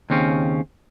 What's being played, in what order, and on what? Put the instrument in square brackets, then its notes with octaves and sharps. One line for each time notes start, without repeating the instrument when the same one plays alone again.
[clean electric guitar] D#2 C#3 C4 C#4